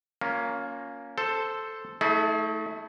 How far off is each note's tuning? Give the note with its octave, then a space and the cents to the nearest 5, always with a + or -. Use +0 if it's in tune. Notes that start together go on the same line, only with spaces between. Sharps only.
A#3 +0 C#4 +15 F4 +30
A4 +0 C5 +0
A3 +0 E4 -45 G#4 +40